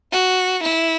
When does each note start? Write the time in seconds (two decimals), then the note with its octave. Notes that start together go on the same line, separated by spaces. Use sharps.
0.12 F#4
0.63 E4